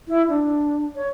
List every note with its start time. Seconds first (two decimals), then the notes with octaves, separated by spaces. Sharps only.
0.08 E4
0.28 D4
0.95 C#5